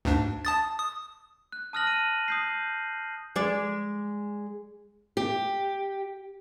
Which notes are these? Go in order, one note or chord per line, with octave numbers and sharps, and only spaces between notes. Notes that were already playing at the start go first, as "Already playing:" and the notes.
D2 G#2 D4
A5 D#6 A6
D#6
F#6
A5 D#6 F6 F#6 A#6 F#7
D#7
D#6 G6 C7
G#3 D5
G4